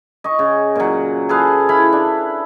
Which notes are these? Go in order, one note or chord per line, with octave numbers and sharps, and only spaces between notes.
D#5 C#6
C#3
A#2 F#3
G#4 A4 B4 F5
E4 F5 B5
D4